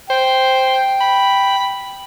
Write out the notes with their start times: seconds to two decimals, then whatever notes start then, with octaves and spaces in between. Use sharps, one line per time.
0.10 C5 G5
1.01 B5